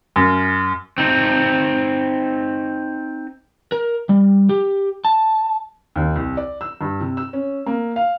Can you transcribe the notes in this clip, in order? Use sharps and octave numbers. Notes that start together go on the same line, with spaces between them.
F#2
C4 D#4
A#4
G3
G4
A5
D#2
C2
D5
E6
G2
C3
E6
C#4
A#3
F5